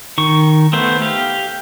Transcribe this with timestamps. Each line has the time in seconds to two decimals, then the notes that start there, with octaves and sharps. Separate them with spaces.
0.18 D#3 C#6
0.73 A3 B3 C5
1.02 G4 F5